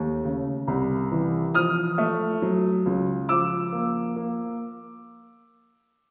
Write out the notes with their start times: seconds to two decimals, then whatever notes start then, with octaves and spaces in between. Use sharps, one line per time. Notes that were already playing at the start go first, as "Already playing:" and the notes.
Already playing: D#2 A3
0.25 C#3
0.67 C2
1.12 E3
1.55 F3 D#6 F6
1.98 A3
2.42 F#3
2.86 C#2
3.29 F3 D6 E6
3.73 A#3
4.16 A#3